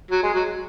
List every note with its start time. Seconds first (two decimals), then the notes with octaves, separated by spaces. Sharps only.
0.11 F#3
0.23 G#3
0.34 F#3